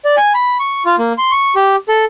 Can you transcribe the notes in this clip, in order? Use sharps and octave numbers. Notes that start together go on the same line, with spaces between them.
D5
G#5
B5
C#6
F4
A#3
C6
C#6
G4
A4